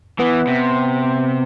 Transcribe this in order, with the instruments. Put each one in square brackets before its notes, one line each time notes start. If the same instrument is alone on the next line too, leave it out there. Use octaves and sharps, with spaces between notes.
[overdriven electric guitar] E3 [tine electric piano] B3
[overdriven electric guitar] C3